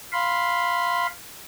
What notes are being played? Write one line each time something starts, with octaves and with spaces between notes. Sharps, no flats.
F5 B5 C6